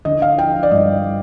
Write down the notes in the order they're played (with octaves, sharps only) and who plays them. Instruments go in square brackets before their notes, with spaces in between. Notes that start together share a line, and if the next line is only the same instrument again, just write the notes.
[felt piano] D3 D#5
F5
F3 G5
D5
G2 D#5